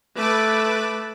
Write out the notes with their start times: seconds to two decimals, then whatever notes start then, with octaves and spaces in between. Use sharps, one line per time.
0.15 A3 A4 B4 D6